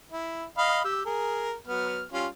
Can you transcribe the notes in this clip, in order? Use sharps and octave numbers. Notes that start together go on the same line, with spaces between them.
E4
D#5 F5 B5
G4 E6
G#4 A#4
F#3 B3 F6
G3 C#4 F4